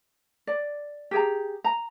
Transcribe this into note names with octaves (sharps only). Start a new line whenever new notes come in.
D5
G4 G#4 A#5
A#5